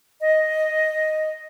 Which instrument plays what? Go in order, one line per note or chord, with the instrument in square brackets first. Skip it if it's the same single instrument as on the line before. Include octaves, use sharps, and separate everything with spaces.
[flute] D#5